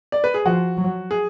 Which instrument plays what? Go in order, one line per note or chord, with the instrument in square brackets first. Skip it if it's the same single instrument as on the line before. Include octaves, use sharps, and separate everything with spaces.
[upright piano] D5
B4
G#4
[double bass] F3 [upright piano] F#4
[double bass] F#3
[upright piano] G#4